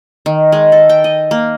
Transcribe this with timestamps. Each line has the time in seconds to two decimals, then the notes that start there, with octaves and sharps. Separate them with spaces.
0.26 D#3
0.52 G#3
0.72 A4
0.89 G5
1.04 D#5
1.31 A#3